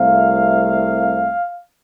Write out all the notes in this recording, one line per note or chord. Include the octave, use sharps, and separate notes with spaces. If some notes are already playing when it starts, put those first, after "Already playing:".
Already playing: C2 C3 A3 C4 F5